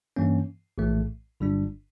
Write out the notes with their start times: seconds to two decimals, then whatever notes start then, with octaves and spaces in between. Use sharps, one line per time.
0.16 G2 E3 A#3 C#4
0.78 A#1 A2 E3 A3
1.40 G1 G2 D3 G3 D4